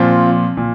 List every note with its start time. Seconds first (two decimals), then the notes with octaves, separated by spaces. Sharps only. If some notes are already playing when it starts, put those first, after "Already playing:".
Already playing: A#2 F3 C4 F4
0.57 A#2